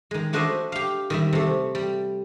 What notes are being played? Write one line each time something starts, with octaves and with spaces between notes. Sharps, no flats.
D#3 G#3
A3 D4 F#4 C5 D#5 E5
G4 F5
D#3 G3 E5
C3 A3
G3